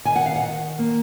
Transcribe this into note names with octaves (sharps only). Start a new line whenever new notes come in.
D#3 G#5
F#5
F5
F#5
D#3
A#3